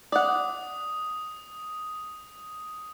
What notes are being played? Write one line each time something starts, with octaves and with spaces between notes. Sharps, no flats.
D5 F#5 D#6